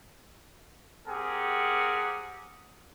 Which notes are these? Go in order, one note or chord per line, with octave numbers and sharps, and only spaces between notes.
C4 G4 G#4 A#4 F#5